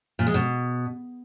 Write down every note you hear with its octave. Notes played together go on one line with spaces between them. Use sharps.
A#2
G#3
B2